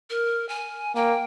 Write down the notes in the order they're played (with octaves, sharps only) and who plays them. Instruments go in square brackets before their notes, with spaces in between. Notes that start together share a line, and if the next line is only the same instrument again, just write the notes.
[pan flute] A#4
G#5
[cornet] A#3 [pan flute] G5